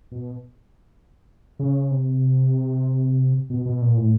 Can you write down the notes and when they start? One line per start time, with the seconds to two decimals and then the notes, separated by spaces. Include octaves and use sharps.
0.12 B2
1.59 C#3
1.91 C3
3.50 B2
3.66 B2
3.82 A#2
3.97 A2